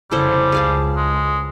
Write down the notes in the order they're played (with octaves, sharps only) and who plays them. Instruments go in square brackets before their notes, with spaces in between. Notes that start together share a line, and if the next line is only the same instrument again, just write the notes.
[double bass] F1 C#3 [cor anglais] G3 [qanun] E4 A4 C5
[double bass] C#2 [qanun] G#4 F5 A5
[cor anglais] G#3